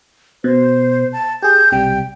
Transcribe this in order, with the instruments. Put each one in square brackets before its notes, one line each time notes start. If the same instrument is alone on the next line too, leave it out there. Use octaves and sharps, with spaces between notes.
[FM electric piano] B2 [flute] C5
[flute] A5
[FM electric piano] G4 G#4 [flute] G6
[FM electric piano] B1 C3 G3 [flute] G5